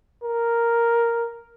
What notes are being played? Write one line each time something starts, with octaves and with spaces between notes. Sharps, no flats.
A#4